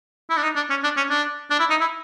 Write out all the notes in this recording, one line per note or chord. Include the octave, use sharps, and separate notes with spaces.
E4
D4
D#4
D4
C#4
D4
C#4
D4
D4
E4
D#4
E4